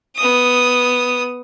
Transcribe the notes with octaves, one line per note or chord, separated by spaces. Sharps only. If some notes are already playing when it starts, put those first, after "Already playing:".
B3 D#6